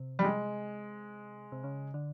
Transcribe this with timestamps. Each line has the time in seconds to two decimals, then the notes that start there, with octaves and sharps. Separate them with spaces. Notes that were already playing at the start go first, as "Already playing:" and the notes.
Already playing: C3
0.19 G3
0.24 G#3
1.52 C3
1.64 C#3
1.94 D3